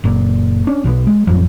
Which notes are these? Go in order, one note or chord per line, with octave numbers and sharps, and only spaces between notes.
F#1 A#2
C#4 D4
B1 B2 D3 B3
G#3
A1 F2 F3 F#3